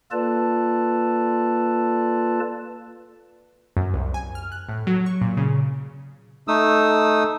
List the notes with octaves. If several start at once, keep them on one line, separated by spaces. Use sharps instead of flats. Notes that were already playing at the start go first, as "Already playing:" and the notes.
A#3 F4 A4 B4 D5 A5
F#2
C2
G#5
F6
F#6
A2
F#3
C#6
A#2
C#3
A3 D#4 D#6 E6